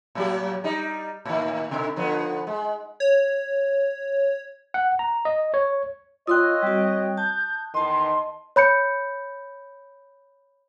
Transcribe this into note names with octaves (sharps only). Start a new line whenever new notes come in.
A2 F#3 G4
G3 D#4
A2 D#3
B2 D3 D#3
D3 F3 B3
G#3
C#5
F#5
A#5
D#5
C#5
F4 C#5 D#5 G5 C6 D#6 E6 F#6
G3 C4 F#4 G5
A5 G6
E2 D#3 D#5 A5 C6
C#5 B5 G6 C#7